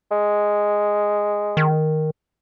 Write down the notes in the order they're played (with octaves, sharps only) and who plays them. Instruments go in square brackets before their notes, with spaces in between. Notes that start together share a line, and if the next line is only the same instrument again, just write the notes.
[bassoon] G#3
[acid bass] D#3